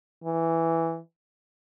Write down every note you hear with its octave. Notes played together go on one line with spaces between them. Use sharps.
E3